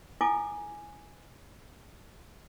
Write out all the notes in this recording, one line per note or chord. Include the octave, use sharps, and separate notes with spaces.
E4 F4 A4 G#5 D6